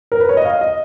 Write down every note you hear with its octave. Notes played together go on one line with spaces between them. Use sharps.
A#4
B4
C#5
D#5
F5
D#5